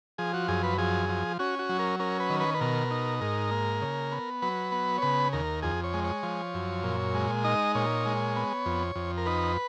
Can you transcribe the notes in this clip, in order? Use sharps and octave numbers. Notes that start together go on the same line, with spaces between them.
F3 G#4
F#4
F#2 G#4
B4
F3 G#4
F3
C#4 F#4
F#4
F#3
A#4
C#4 A#4
B4
D#3
B4
B4
B2 A#4
D#4
G#2 A#4
A#3
C#3
B3
F#3 B4
B3
C#5
C#3 B4
D#2 A#4
F2 G#4
C#5
G#3
C#5
F3
F#2
A#2
G#3
D#4 D#5
A#2 C#5
G#3
B3
F2
F2
A#4
D#4 B4